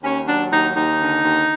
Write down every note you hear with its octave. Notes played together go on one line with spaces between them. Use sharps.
D#2 C#4
F#3 D4
D#2 D#4
D#2 D#4
D3
D#2